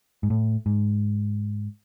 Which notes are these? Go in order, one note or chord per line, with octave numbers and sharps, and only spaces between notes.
G#2
A2
G#2